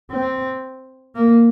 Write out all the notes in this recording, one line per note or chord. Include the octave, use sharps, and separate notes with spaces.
C4
A#3